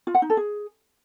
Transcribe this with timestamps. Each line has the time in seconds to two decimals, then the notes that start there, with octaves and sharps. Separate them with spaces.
0.07 F4
0.15 F#5
0.22 D#4
0.30 A4
0.37 G#4